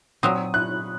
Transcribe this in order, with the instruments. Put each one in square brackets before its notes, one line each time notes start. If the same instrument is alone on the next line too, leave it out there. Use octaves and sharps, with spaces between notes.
[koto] A#2 F#3 C4 [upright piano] D#6
[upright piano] F#6